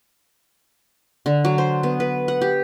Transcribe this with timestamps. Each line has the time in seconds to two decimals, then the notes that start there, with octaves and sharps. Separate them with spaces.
1.26 D3
1.45 F#3
1.58 C5
1.83 B3
2.00 B4
2.28 F#5
2.41 G4